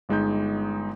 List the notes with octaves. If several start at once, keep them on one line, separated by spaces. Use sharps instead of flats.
G1 G#3 D#4 G6